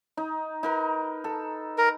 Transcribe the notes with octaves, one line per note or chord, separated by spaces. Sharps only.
D#4
D#4 A#4 B4
A4
A#4